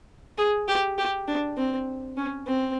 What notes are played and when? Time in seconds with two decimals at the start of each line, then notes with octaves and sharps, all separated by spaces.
0.38 G#4
0.68 G4
0.98 G4
1.28 D4
1.57 C4
2.17 C#4
2.47 C4